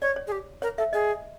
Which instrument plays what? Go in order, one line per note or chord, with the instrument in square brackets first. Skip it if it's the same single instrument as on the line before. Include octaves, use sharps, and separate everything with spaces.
[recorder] C#5 [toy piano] D5
[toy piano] C#5
[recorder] G#4
G4
[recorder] A#4 [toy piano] C#5
[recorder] A4 [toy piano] E5
[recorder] G#4 [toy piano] D#5